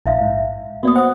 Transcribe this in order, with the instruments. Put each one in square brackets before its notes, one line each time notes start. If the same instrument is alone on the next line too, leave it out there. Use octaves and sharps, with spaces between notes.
[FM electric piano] A#1 [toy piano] E4 E5 F5
[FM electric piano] G#2
[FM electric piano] A#3 B3 [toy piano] F#4 D5 D#6
[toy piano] C5 D#6 [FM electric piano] F#5